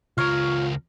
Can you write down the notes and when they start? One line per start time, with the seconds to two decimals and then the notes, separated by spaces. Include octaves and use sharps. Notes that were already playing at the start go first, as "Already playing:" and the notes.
0.18 C#2 F4 A#4 C#5 F5